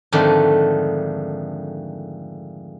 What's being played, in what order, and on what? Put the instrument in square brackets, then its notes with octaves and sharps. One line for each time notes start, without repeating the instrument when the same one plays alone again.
[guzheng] F2 G#2 D3 D#3 A3